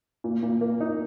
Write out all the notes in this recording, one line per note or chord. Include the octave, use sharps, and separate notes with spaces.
A#2
A#2
A#3
D#4